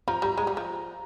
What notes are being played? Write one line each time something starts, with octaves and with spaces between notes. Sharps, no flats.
F3 A#5
G3 A#5
G#3 A#5
G3
F3